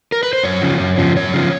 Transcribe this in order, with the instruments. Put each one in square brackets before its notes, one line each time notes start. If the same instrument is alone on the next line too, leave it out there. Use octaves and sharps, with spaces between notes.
[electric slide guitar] A#4
B4
C5
F#2 C#5
C#3 F3
F#2
C#3 F3
F#2 C#5
C#3 F3